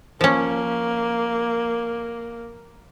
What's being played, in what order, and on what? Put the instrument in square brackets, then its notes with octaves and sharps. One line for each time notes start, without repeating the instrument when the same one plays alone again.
[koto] F3 C#4 [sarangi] A#3